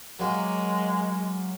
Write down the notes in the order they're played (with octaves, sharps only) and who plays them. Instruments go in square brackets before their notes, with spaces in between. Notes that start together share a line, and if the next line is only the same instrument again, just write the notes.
[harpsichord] F#3 A#3 [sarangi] G#3